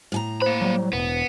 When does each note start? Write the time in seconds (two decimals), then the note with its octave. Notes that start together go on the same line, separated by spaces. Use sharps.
0.12 A2 G#5 A#5
0.42 A#3 C5 B5
0.61 F#3 G3
0.93 E1 B3